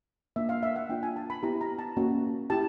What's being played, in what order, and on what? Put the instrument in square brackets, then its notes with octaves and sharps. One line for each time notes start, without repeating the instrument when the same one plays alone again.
[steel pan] A#3 D4 F4 E5
F5
E5
F#5
A#3 D4 F4 G5
G#5
A5
B5
B3 E4 G4 A#5
A#5
A5
A#3 C#4 F#4
E4 G4 A5